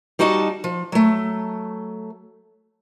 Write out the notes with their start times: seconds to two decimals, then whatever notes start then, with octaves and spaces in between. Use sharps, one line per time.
0.19 G3 D#4 F#4 D#5 A5
0.64 F3
0.92 F#3 A3